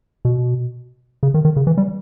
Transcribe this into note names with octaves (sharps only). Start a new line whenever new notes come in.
B2
C#3
D#3
D#3
C#3
E3
G3